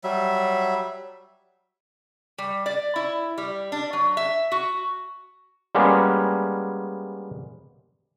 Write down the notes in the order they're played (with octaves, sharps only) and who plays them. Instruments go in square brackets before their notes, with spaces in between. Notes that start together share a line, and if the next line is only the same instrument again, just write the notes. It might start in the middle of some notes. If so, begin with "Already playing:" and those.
[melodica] F#3 G3 E5
[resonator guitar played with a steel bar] G3
D5
E4
G3
D4
F#3
E5
F#4
[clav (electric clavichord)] G3 G#3 A#3 B3 C#4